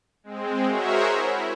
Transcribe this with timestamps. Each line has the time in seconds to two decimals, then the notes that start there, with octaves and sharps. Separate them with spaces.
0.24 G#3 C4
0.66 F#4 G#4 A#4 C5 C#5 E5
1.13 E4